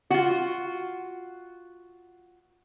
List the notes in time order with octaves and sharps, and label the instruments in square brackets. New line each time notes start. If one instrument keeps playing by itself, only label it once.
[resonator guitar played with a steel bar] F4 F#4